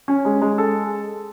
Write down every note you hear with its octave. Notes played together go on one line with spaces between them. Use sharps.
C#4
G#3
G#3
A4